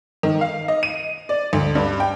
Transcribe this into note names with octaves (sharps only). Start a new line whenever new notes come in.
D#3
F5
D#5
D#7
D5
D2
G2
G5